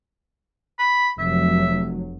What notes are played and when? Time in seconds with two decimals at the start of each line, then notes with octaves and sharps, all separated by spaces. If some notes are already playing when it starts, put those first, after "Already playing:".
0.79 B5
1.19 F1 F#3 E5